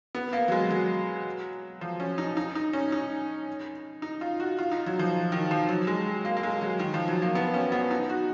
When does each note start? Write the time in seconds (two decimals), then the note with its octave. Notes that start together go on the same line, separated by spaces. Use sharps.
0.15 B3
0.33 A#3
0.48 F#3
0.52 G#3
0.71 F#3
1.81 F3
2.00 C#4
2.18 D#4
2.37 D#4
2.55 D#4
2.73 C#4
2.92 D#4
4.02 D#4
4.21 F4
4.40 F#4
4.58 F4
4.71 D#4
4.86 F#3
4.99 F3
5.32 D#3
5.51 F3
5.69 F#3
5.87 G#3
6.25 A#3
6.37 A#3
6.43 G#3
6.61 F#3
6.79 D#3
6.94 F3
7.08 F#3
7.22 A#3
7.35 B3
7.54 C#4
7.72 B3
7.91 D#4
8.10 F#4